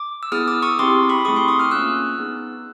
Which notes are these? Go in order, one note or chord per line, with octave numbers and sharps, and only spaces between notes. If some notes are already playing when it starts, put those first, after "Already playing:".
Already playing: D6
E6
B3 E4 G#4 D#6 F6
D6 E6
C#6 D#6
C4 E4 G4 C6 D6
B5 C#6
A3 C4 E4 G#4 C#6 D#6
C6 D6
C#6 D#6
D#6 F6
A#3 C#4 F4 E6 F#6
B3 D#4 G#4